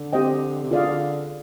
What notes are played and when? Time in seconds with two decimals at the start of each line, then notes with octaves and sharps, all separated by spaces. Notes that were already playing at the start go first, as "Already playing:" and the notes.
Already playing: D3
0.13 C4 G4 C5 D#5 G5
0.63 C3
0.71 D3 F4 G#4 D5 F5